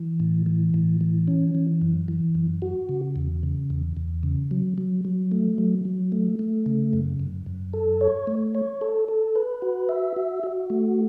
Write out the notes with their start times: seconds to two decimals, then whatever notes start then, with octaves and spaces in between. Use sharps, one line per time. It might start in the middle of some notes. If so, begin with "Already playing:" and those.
Already playing: E3
0.20 A2
0.46 E3
0.74 A2
1.01 E3
1.28 C#4
1.55 E3
1.82 F#2
2.08 E3
2.35 F#2
2.62 F#4
2.89 C#3
3.16 E2
3.43 C#3
3.70 E2
3.97 E2
4.23 C#3
4.51 F#3
4.78 F#3
5.05 F#3
5.32 A3
5.58 F#3
5.85 F#3
6.12 A3
6.39 A3
6.66 C#3
6.93 F#2
7.20 F#2
7.46 F#2
7.73 A4
8.01 C#5
8.27 A3
8.55 C#5
8.81 A4
9.08 A4
9.36 B4
9.62 F#4
9.89 E5
10.16 F#4
10.43 F#4
10.70 A3